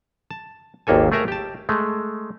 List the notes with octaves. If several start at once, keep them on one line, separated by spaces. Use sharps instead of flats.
A5
G#1 D#2 A#3 A4 G#5
A3 G#4 A#4 E5 A#5
G4 A5
G#3 A3